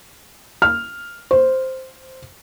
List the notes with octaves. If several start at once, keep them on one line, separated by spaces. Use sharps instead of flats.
F6
C5